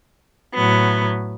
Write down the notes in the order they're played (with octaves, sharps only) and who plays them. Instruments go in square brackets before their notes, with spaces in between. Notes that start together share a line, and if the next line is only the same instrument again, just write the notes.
[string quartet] A2 F#3 B3